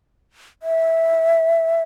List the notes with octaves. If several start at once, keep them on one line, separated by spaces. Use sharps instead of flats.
E5